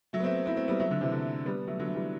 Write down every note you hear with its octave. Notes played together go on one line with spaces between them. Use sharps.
F#3 A3
B3
A3 C4
C4 E4
A3 C4
G3 B3
F#3 A3
D3 F#3
C3 E3
D3
G3 B3
F#3 A3
D3 F#3
A3
E3 G3